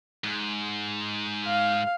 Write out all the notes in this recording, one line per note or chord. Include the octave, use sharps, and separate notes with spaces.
G#2
F5